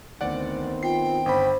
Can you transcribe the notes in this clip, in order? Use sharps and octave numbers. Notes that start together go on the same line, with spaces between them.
D2 D#3 B3 C4 D5 F#5
F4 G5 C7
G1 C5 B5